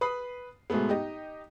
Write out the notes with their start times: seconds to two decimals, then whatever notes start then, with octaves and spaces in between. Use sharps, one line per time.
0.01 B4 B5 D#6 C7
0.70 G#2 B2 G#3 A3 B3
0.89 D#4 G4 D#5